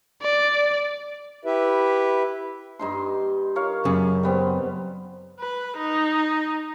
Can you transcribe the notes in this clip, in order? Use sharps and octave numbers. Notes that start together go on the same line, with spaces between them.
D5
E4 G4 B4 E5
G2 D#4 C6
A#4 C#5 F5
F#2 C#3
G3 B3 C4
B4
D#4